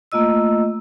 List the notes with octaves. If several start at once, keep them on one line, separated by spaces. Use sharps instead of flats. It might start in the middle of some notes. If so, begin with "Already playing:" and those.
A3 A#3 F4 D#5 E6